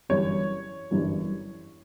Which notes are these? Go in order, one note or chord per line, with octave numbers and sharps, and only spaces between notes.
G1 F#2 E3 G3 C#5
G1 F#2 E3 G3